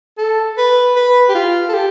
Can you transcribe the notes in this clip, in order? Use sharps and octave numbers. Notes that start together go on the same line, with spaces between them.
A4
B4
B4
G4
F4
A4
G4